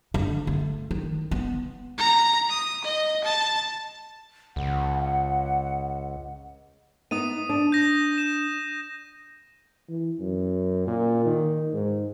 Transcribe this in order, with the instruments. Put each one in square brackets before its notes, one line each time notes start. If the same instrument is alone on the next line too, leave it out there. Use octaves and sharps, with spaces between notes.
[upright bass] D3
A3
D#3
B3
[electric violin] A#5
D#6
D#5
A5
[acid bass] C#2 [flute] F#5
[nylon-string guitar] B3 D#4 [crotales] D#6 D#7
[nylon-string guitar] D4
[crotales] G6 A#6
E7
[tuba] E3
F#2
A#2
D#3
G#2